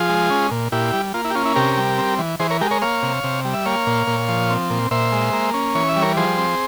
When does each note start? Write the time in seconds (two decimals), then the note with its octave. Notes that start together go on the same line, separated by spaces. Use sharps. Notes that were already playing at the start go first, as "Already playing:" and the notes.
Already playing: F3 F4 G#4
0.09 G#3
0.30 C#4
0.51 A#2
0.72 A#2 E4 G4
0.93 G3
1.14 A#3 F4
1.25 E4
1.30 G4
1.35 C#4 F4
1.45 E4
1.56 C3 G4 A#4
1.77 G3
1.98 C4
2.19 E3
2.40 E3 G#4 C5
2.50 A#4 C#5
2.61 G#3 G4 A#4
2.71 A#4 C#5
2.82 A#3 C#5 F5
3.03 C3
3.24 C3
3.45 G3
3.54 E5
3.66 A#3 C#5 F5
3.87 A#2
4.07 A#2
4.28 F3
4.50 C4
4.70 A#2
4.91 A#2 C5 E5
5.12 G#3
5.33 A#3
5.54 C#4
5.75 E3 C#5
5.89 E5
5.96 G3
6.02 A#4 C#5
6.17 F3 G#4 C5
6.38 C4